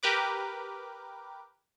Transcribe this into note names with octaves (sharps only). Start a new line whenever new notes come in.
G4 A#4 B4 D6